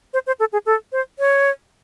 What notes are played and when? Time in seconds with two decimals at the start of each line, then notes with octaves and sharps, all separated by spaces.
0.14 C5
0.27 C5
0.40 A4
0.53 G#4
0.66 A4
0.92 C5
1.19 C#5